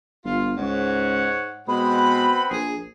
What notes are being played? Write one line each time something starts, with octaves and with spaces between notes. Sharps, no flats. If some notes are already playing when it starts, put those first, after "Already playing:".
G1 F4
C#2 G#2 C#5 F#5
B2 G#3 C4 B4 F#5 B5
A#1 G#4